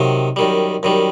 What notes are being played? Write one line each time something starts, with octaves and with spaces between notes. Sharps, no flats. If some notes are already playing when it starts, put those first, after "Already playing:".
Already playing: C3 D#3 F#3
F#2 D#3 G3
F#2 D#3 G3